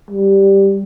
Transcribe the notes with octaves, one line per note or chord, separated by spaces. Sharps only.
G3